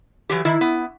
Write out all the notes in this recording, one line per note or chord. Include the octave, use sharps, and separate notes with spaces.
E3 F#3 G4
D#3 E4
B3